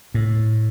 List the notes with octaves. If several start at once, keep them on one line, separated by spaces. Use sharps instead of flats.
A2